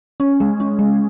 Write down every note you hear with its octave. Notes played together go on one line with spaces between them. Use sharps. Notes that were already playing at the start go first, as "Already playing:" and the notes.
C#4
G#3
C#4
G#3